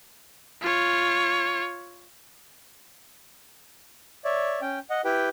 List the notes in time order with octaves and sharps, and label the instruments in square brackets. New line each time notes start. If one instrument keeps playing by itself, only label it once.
[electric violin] F4 C#5
[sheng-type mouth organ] C#5 D5 E5
C#4 G5
D#5 F#5
E4 G4 B4 G5